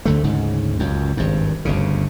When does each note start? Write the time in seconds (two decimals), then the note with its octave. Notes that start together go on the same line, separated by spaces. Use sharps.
0.05 D2 D3 A3
0.24 D2 G#2 C#3
0.79 C#2 F#2
1.17 G#1 G2
1.65 G1 D2 C#3